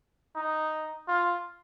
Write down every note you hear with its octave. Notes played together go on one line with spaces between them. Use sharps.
D#4
F4